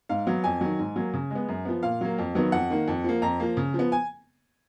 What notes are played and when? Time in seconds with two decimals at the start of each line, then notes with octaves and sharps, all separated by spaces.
0.09 G#2 F5
0.27 F#3 B3
0.44 F2 G#5
0.61 D#3 F#3
0.79 G#2
0.96 F#3 A#3
1.13 C#3
1.30 G#3
1.35 B3
1.49 F#2
1.65 F3 B3
1.83 A#2 F5
2.01 F#3 A#3
2.18 F2
2.35 D#3 F#3 B3
2.52 F2 F#5
2.70 D#3 A#3
2.88 F2
3.04 F3 A#3
3.22 F2 A#5
3.40 F3 A#3
3.57 C#3
3.74 F3
3.79 B3
3.92 G#5